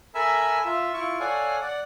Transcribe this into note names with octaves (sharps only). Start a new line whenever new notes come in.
A4 A#4 E5 G#5 B5 E6
F4 E5
E4 F4 C#6
A4 C#5 D5 F5 F#5 G#5
D5 F#5